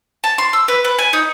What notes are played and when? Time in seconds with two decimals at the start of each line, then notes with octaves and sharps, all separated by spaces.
0.24 A5
0.38 C6
0.53 E6
0.68 B4
0.85 B4
0.99 G#5
1.13 D#4